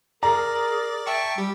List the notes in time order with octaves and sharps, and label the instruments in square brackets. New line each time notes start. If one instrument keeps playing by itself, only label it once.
[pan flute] G#4 [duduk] A#4 [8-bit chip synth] D5 [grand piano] A#5
[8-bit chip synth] E5 A5 C#6 [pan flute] G5
[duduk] G3 [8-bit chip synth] G4